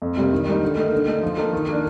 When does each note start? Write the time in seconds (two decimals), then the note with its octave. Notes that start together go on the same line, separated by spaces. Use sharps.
0.02 F2
0.17 C3 G3 A#3
0.33 D#3
0.48 G3 A#3 D#4
0.63 D3
0.77 A3 D#4 A#4
0.93 D3
1.08 A3 D#4
1.23 F3
1.38 A#3 D#4 A4
1.53 D#3
1.68 A#3 D4